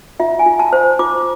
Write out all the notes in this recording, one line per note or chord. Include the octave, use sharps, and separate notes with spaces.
F4 E5
G#5
F4
A5
C5
F4 D6